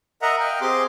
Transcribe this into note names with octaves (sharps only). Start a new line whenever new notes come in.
A#4 D#5 E5 F#5 A#5
D#5 F5 G5
C4 G4 G#4 C6 D6